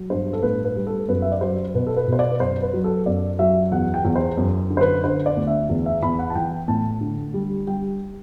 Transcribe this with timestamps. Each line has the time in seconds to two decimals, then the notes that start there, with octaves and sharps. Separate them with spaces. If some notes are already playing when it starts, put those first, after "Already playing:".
Already playing: F#3
0.10 G2 C5
0.33 A4
0.43 A2 B4
0.65 B4
0.76 G3
0.87 A4
1.08 F#2 B4
1.22 E5
1.32 D5
1.41 F#3 C5
1.75 B2 B4
1.87 A4
1.96 B4
2.08 B2 C5
2.19 D5
2.32 B4
2.40 F#2 C5
2.62 B4
2.73 F#3
2.84 A4
3.06 F#2 D5
3.39 F#3 E5
3.72 E2 F#5
3.94 G5
4.05 E2
4.16 C5
4.37 F#2
4.70 D3
4.77 C5
4.81 B4
5.04 D3 C5
5.26 D5
5.37 D2
5.47 E5
5.69 E2
5.86 E5
6.03 E2 B5
6.19 F#5
6.30 A5
6.35 E3 G5
6.68 A2 A5
7.01 D3
7.34 G3
7.67 G3 G5